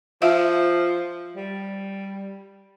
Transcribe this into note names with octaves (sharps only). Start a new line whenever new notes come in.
F3 F4 E5 F5
G3